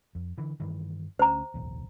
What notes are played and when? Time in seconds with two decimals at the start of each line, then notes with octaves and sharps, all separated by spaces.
0.15 F2
0.38 D3 E3
0.60 G2 D#3 E3
1.19 D2 C#4 C5 A#5
1.54 D1 B1 E2